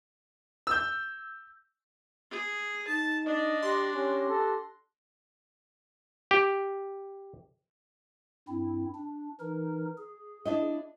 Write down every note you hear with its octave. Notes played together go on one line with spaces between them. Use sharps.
E6 G6
G#4
D#4 A5
D4 D#5
G4 C6 F#6 A#6
C#4 G4
A4
G4
G2 C4 E4
D4
E3 D#4 A#4
G#4
D4 E4 D#5